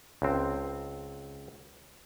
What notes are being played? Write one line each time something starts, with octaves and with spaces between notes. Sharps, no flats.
C#2 C4